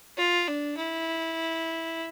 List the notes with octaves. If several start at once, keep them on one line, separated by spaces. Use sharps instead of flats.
F4
D4
E4